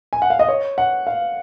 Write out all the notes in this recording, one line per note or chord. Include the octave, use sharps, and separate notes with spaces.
G#5
F#5
F5
D#5
C#5
F#5
F5